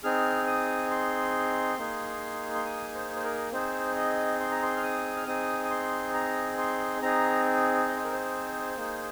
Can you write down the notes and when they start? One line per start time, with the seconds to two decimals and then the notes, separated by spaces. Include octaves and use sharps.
0.04 C4 D#4 G#4 F6
0.47 D#6
0.91 C6
1.78 A#3 D#4 G#4
2.55 C6
2.65 D#6
2.95 C5
3.16 C5
3.24 A#4
3.52 C4 D#4 G#4 C5
3.96 D#5
4.40 C6
4.51 A#5
4.62 C6
4.77 F6
4.83 D#6
5.17 F6
5.26 C4 D#4 G#4 D#6
5.64 D#6
5.70 C6
6.14 A#5
6.58 C6
7.02 C4 D#4 G#4 A#5
7.88 D#5
7.96 C5
8.04 A#4
8.12 C5
8.76 A#3 D#4 G#4